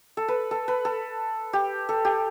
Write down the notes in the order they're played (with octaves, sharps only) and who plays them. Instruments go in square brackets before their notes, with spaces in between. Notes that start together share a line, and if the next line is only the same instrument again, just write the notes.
[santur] A4
B4
A4
B4
A4
G4
A4
G4